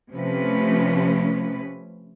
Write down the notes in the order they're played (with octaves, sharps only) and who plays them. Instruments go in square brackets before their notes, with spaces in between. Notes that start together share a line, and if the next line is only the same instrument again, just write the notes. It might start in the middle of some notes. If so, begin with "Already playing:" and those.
[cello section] C3 F3 A3 C#4 B4